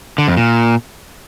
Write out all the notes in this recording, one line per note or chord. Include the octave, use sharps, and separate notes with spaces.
D3
F2
A#2